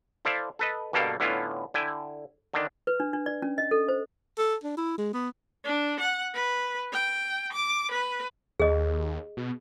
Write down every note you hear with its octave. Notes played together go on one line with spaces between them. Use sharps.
E4 A4 C5 D5 E5 F5
A4 B4 D#5
G2 B2 A#3 A4 F5 G5
A2 D3 B3 C#4 E4 F4
D3 E4 G5 G#5
D3 D#3 D4
B4
D4
D4
D5
C#4
D#5
A4
C5
A4
D4
E4
G#3
B3
D4
F#5
B4
G5
D6
B4
D#2 G#4 D#5
B2